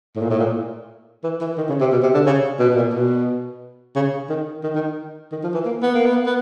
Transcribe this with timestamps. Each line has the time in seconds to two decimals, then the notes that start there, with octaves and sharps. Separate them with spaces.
0.16 A2
0.22 A#2
0.30 A2
0.39 A#2
1.24 E3
1.41 E3
1.57 D#3
1.69 C#3
1.80 C3
1.92 B2
2.03 C3
2.14 D3
2.26 C#3
2.59 B2
2.70 B2
2.76 A#2
2.94 B2
3.95 C#3
4.29 D#3
4.63 D#3
4.75 D#3
5.32 D#3
5.43 F3
5.54 E3
5.66 A#3
5.83 B3
5.94 A#3
6.06 B3
6.26 B3